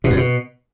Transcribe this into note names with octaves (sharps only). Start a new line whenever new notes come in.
B2
F#2
B2